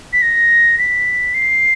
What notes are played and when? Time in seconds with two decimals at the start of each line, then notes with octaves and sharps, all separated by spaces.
0.13 B6
0.22 A#6
0.79 B6
1.34 C7